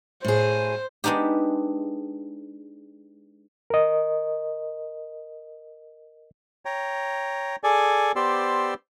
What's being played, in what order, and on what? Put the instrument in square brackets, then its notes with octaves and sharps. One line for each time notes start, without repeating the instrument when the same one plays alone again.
[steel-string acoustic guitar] A2 G#4 [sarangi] C5
[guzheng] G#3 B3 D4 D#4 G4
[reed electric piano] A#4 D#5
[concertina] C#5 G5 A#5
G#4 A4 D5 G#5
B3 G4 C5 D5 C6 E6